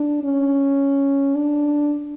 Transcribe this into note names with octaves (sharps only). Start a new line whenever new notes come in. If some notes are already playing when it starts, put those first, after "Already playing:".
Already playing: D4
C#4
D4